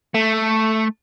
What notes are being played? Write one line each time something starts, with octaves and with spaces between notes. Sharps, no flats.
A3